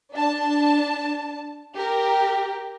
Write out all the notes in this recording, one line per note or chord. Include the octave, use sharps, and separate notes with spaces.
D4 A5
G4 A#4